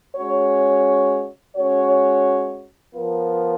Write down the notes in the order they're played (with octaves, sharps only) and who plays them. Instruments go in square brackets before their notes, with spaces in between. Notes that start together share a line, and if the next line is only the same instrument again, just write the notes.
[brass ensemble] G#3 C#4 F#4 C#5
G#3 C#4 F#4 C#5
F3 B3 F4 A#4